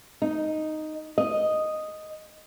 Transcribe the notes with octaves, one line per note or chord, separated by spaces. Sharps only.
D#4
D#5